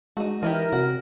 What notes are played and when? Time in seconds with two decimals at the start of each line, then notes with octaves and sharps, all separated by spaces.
0.17 G#3 D#4 F#4
0.43 E3 D#4 E4 G4 A#4
0.72 C3 F#4